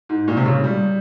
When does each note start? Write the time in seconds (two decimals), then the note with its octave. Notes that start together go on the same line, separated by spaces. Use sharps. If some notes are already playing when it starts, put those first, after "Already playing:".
0.09 G#2
0.28 A#2
0.37 C3
0.46 C#3
0.64 G3